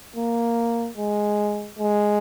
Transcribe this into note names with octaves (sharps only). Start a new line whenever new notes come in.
A#3
G#3
G#3